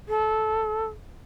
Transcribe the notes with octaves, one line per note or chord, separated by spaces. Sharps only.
A4